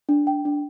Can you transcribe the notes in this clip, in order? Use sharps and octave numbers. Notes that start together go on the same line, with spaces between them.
D4
G5
D4